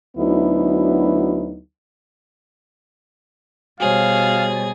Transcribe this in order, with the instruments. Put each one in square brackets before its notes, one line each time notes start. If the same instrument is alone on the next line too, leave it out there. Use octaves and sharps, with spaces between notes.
[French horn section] D2 D3 F#3 B3 D#4 E4
[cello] B2 G3 [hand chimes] F#4 C5 C#5 [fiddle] G#4 [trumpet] F5